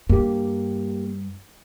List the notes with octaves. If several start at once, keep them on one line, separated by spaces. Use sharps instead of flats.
G2 A#3 G4